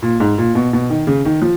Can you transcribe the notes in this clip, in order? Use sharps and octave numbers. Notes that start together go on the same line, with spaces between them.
A#2
G#2
A#2
B2
B2
D#3
C#3
D#3
F3